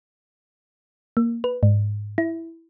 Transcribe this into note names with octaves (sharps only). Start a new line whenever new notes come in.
A#3
B4
G#2
E4